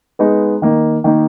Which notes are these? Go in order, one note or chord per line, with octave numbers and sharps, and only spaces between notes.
G#3 B3 D#4 G#4
D#3 A#3 D#4
D#3 A#3 D#4